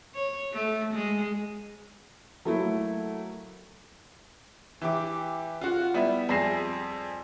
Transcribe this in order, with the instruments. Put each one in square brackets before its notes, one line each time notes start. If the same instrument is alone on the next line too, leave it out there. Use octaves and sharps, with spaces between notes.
[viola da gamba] C#5
A3
G#3
[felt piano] F#3 A3 A#3 E4
[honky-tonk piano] E3 G4 D6
F4 F#4 F#5
G3 B3 E4
F2 G3 G#4 A#6 C7 E7